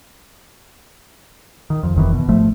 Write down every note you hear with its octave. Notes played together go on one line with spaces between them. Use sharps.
D#3
F2
F1 F2 D#3 E3
B2
G#1 F3 A3